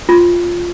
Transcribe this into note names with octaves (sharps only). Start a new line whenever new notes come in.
F4